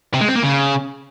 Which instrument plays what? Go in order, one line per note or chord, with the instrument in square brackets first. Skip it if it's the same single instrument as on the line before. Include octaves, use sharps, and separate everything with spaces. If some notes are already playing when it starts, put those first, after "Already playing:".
[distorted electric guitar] C3
G#3
C4
A#3
C#3